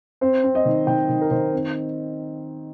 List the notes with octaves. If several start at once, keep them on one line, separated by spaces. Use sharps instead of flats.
C4 C5
C4
D#5
D#3
D#3 G5
D#3
A#4
D#3 C5
C4